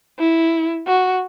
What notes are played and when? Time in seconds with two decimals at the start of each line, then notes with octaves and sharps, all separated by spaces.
0.19 E4
0.87 F#4